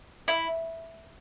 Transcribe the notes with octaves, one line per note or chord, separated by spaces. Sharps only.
E4